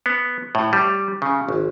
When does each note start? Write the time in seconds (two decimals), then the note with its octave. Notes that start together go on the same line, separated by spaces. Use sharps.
0.06 B3
0.55 A2
0.73 G3
1.22 C#3
1.49 G#1